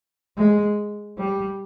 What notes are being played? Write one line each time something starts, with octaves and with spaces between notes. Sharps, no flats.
G#3
G3